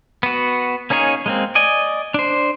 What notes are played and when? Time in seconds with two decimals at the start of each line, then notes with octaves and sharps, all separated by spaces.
0.23 B3 F#4
0.90 A#3 C#4 D#4 G#4 C#5
1.26 G#3 A#3 C4
1.55 D5 D#5 G#5
2.14 D4 C5